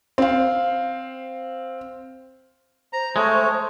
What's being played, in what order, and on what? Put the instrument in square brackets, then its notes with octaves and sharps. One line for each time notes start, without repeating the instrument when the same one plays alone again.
[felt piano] C4 F5
[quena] C5 [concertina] A#5
[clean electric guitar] G#3 [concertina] A3 C#5